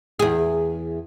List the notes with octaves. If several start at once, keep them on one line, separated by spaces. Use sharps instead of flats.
E2 G#4